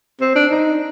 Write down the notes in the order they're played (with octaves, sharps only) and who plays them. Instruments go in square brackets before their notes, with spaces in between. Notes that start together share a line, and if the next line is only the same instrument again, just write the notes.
[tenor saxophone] C4
D4
D#4